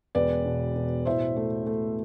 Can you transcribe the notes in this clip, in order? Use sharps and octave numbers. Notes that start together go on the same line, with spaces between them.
E1 B4 D5
B2
B2
A2 C5 E5
A3
A3